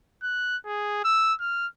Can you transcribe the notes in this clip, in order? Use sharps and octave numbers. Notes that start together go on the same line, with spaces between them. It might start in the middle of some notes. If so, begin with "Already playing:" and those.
F#6
G#4
E6
F6